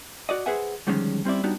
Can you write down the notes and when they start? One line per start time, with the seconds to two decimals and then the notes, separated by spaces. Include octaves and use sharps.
0.29 F#4 D5 D#5
0.46 G#4 B4 C5 E5 F#5 G#5
0.87 D3 D#3 F3 G3 G#3 C#4
1.25 G3 C4 C#4 E4 D5
1.43 G3 B3 D4 D#4 F#4 C#5